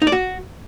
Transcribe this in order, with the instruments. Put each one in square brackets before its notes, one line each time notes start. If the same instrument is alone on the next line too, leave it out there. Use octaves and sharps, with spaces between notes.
[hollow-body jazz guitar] D#4
D5
F#4